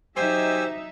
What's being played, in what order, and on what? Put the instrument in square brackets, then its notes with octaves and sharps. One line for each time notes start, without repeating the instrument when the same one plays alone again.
[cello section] F#3 D#4 E5 [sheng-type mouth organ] G4 G#5 E6 [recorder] C5